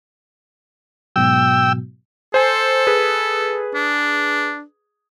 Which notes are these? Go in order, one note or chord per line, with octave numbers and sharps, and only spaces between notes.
G#2 B2 F#3 G5 E6
A4 C5 G#5
G#4 B4
D4